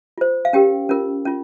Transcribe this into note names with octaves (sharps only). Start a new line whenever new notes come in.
F4 C5
F5
C#4 G4 A#4 G5
C#4 F4 A#4
C#4 F4